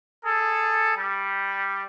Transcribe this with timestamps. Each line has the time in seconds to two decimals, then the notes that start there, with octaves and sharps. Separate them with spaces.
0.25 G#4 A4
0.97 G3